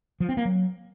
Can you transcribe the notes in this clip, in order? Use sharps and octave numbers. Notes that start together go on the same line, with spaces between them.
F3
C4
A#3
F#3